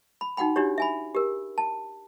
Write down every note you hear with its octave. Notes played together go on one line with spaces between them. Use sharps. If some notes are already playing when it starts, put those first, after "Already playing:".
B5
D#4 F#4 F#5 G5 B5
D4 E4 F#4 G4 C#5
E5 G#5 B5
G4 A#4
A5